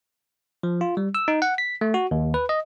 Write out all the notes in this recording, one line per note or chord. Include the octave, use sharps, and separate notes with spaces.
F3
F4
G3
E6
D#4
F#5
B6
A3
F#4
D#2
B4
D#5